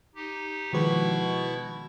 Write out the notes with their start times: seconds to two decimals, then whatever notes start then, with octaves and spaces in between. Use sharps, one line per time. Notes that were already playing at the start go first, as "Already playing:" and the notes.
0.15 D#4 G4
0.73 B2 D#3 F3 G#3 E4 B4 C#6